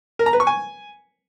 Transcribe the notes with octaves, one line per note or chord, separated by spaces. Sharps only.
A#4
A#5
B4
C#6
G#5